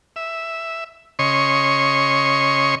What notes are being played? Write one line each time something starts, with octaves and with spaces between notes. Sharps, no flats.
E5
C#3 C#5 D#5 C6 C#6